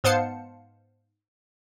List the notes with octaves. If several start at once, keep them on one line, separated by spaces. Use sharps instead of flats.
G#2 B3 C5 F5 A5 C#7